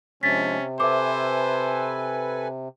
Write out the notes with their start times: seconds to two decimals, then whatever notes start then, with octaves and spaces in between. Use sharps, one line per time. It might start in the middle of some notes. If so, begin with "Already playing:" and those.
0.23 C3 F3 G#3 C#4 D4 A6 B6
0.80 A4 B4 C5 E5 G#5 D6